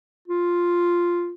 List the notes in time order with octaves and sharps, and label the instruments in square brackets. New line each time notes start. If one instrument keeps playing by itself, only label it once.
[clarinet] F4